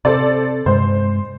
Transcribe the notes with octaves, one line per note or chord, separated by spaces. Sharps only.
C3 A4 C5 D5
G2 C3 G#3 C5